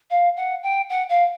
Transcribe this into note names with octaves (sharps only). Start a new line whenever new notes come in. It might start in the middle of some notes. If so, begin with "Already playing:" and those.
F5
F#5
G5
F#5
F5